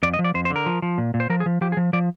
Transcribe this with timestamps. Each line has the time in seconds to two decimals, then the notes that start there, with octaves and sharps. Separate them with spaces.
0.03 F2 D5
0.14 D#5
0.19 F3
0.24 D5
0.34 F2 C5
0.45 C5
0.50 D3
0.56 A#4
0.66 F3
0.82 F3
0.98 A#2
1.14 A#2
1.20 C5
1.30 F3 A#4
1.40 G#4
1.46 F3
1.61 F3 G4
1.72 G#4
1.77 F3
1.93 F3 D5